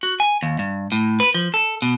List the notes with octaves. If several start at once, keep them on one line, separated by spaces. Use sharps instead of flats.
F#4
G#5
D#2
G2
A2
B4
F3
A4
B2